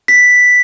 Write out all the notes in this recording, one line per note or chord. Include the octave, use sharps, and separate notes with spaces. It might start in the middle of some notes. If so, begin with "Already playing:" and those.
B6